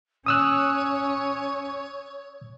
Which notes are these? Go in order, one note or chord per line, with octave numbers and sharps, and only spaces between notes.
C#4 C#5 D#6 E6 F#6